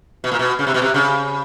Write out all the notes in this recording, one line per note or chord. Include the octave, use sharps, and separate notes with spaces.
B2
A#2
B2
C#3
C3
B2
C3
C#3